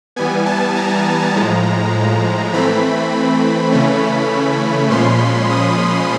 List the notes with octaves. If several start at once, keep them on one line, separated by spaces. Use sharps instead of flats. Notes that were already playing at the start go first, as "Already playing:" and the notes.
E3 G3 B3 G#5
A5
A#5
A2 F3 G#3
E3 A3 C4 B5
C#3 E3 A3 C#4
A#2 F3 G#3 C#4 C6
D#6